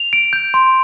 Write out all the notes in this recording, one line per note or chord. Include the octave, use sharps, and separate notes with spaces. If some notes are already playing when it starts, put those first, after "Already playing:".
Already playing: F7
D7
G6
C6